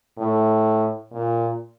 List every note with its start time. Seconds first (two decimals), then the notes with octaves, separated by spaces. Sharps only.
0.18 A2
1.13 A#2